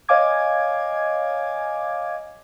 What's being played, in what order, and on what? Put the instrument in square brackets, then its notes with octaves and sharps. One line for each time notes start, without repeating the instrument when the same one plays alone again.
[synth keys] C#5 D#5 F5 G#5 D6 G#6